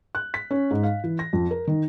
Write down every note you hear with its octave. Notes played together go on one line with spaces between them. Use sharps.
F#6
B6
C#4
G#2
F5
E3
A#6
F2
A#4
D#3